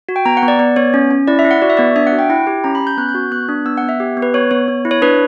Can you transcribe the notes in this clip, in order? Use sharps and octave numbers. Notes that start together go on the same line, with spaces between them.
F#4
G5
B3 A#5
F#5
B3
D5
B3 D5
B3 C#5
C#4
C#4
E4 D5
E5
E4
F#5
F#4 D5
E5
B3 D5
D4 E5
F#5
F#4
G5
E4 G5
G4
C#4 A#5
B5
C#4
G6
B3 F#6
G6
F#4
B3 F#6
D4
B3 E6
F#5
B3
E5
G4
B3
B4
B3 C#5
B3 C#5
B3
E4
C#5
D4 B4